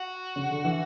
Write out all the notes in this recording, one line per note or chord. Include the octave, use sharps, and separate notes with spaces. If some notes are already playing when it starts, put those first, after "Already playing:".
Already playing: F#4
C#3
D3
E3